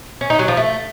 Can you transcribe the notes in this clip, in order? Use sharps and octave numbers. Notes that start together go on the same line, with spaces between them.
C#4
D#4
F#3
F3
A3